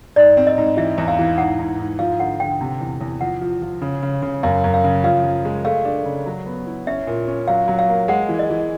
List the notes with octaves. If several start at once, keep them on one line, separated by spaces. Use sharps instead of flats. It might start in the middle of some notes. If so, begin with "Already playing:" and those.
G#2 D5
C4
D#5
G#2
E3 E5
E2
F5
E3
G#2 F#5
G#2
G#2
F3 F5
D3 F#5
D3 G5
C3
E2
E2
F3 F#5
F3
F3
C#3
C#3
C#3
F#2 F5
F#2
F5
C#3
F3 F5
F3
G#3
A3 F5
D4
C#3
F#3
B3
E4
C#4 E5
A#2
C#4
F#3 F5
F#3
F5
A#3
G#3 F#5
E3
D#5
E3